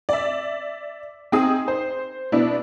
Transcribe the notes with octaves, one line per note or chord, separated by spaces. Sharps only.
D5 E5
C4 D#4 G#4 D#6
C5
B2 B3 D4 E4